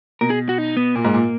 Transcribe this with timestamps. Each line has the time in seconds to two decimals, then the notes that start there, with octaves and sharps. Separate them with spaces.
0.21 B2 A#4
0.30 G#4
0.49 F#4
0.58 D#4
0.77 B3
0.95 A#2 A#3
1.05 G#2
1.14 A#2